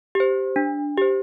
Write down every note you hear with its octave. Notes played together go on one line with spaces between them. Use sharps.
G4 C5
D4
G4 C5